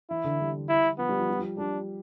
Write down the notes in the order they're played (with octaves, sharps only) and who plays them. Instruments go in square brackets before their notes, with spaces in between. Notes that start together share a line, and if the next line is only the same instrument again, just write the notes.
[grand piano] E3 [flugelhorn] E4
[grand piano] D3
G3
[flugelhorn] E4
[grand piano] F3 [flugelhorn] B3
[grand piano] G3
F3
G3
F3
[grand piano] G3 [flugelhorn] D4